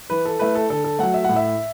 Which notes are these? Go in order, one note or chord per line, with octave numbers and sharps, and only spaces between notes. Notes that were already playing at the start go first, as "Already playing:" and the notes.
E3 B4
A4
A3 E4 B4
A4
D3 A4
A4
F#3 A3 F#5
E5
A2 F#5
E5